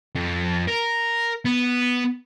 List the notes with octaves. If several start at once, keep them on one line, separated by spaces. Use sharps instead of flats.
F2
A#4
B3